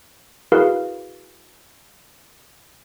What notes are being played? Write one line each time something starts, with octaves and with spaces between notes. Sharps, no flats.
E4 F#4 G#4 A#4 B4 F5